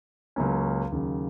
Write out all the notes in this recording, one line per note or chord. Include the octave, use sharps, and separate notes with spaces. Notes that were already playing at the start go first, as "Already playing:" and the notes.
C#2 C#3 F#3 A#3 C#4
D#2 C#3 F#3